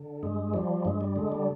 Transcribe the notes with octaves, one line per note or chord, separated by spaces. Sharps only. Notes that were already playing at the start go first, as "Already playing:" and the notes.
Already playing: D3
G2 G#3
F3 G3
G2 G#3
G3
D3 G#3
G3